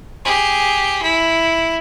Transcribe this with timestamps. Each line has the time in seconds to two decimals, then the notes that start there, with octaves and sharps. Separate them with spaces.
0.25 G4 G#4
1.02 E4